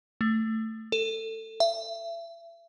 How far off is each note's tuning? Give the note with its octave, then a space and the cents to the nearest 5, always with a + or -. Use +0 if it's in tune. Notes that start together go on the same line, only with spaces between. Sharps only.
A3 +15
A4 +20
E5 +30